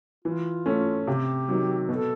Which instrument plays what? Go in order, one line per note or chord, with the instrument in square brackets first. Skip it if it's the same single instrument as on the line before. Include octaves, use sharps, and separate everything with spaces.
[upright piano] E3 [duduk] F4
[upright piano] A3 C#4
[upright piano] C3 [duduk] G4
[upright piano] D#3 F#3
[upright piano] B2 [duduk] A4